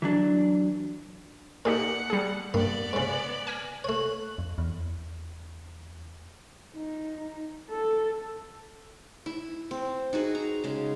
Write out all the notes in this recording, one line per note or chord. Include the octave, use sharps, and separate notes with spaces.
E3 F#3 D4
A#2 D#4 G4 A4 F#5 C#7
G3 G#4
G2 A#3 B3 D5
G#2 C#3
G#5 F6 A#6
A3 C#5 F#6
F2
E2
D#4
A4
E4
C4
D#4 F#4 G#4 B4
A#5
C#3 G#3